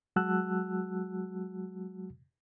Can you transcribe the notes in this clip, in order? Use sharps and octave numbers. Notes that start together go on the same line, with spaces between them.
F#3 G#3 F#4 A5 E6 F#6